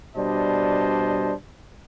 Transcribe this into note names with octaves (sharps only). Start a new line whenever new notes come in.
B2 G3 D4 C5 D#5 A5